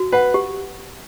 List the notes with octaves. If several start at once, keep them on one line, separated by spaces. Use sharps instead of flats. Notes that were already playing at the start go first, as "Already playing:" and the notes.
Already playing: F#4
B4 F#5
G4